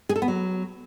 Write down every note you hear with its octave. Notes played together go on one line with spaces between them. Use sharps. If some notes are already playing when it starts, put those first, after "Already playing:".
G#4
A4
B3
F#3